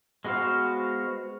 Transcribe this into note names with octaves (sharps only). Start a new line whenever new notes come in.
G#3 B3 F#4 C5 F5